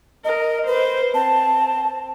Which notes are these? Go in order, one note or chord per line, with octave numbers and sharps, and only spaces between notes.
A#4 D#5
B4 C5
C4 A5